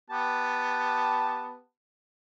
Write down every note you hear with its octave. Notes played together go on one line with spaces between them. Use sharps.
B3 G4 A5